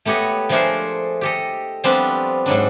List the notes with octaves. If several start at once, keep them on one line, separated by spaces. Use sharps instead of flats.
A3 B3 G4 C#5 D#5
F3 A3 D4 G#4 A#4 C5
G4 A4 D#5
F3 G3 B3 C4 D4 F4
G#2 F#3 D4